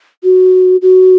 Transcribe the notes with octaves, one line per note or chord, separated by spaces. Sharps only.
F#4
F#4